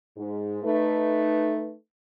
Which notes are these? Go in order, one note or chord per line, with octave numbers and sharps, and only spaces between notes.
G#2
A3 D#4 B4